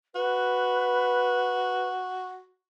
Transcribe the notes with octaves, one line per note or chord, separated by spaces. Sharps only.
F#4 B4